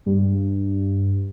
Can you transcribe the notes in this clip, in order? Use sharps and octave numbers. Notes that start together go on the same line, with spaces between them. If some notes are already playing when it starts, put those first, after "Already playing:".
G2